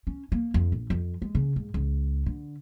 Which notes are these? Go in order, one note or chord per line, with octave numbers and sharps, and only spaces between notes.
C#4
A#3
F2
A#1
F2
G#3
C#3
G#2
C#2
D3